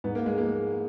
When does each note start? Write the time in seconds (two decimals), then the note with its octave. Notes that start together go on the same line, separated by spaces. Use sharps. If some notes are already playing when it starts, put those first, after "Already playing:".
0.04 G#2 B3
0.15 A#3
0.26 G#3
0.38 F3 A#3